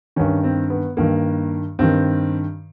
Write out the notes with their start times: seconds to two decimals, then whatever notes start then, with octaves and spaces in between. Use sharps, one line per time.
0.16 G2 D#3 C#4
0.44 C4
0.70 B3
0.97 G2 D#3 A#3
1.79 G2 D#3 C4